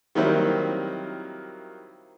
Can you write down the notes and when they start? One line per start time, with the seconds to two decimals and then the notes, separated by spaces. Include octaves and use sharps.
0.15 D#3 F#3 G3 A#3 C4 E4